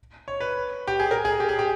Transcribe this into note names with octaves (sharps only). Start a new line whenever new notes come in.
C#5
B4
G4
G#4
A#4
G#4
G4
G#4
G4